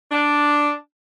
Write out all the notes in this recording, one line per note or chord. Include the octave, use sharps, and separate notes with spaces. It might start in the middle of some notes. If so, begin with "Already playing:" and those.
D4